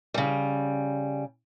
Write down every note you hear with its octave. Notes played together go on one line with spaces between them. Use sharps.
C#3 G3